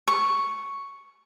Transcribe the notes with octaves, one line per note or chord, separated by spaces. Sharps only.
C#6